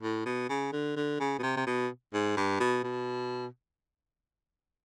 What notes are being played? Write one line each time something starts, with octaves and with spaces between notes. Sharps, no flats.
A2
B2
C#3
D3
D3
C#3
B2
C3
C3
B2
G#2
G2
B2
B2